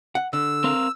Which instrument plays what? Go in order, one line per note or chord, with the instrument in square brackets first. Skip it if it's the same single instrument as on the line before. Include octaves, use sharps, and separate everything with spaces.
[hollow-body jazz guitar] F#5
[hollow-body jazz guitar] D3 [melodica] E6
[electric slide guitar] C4 A#4 F5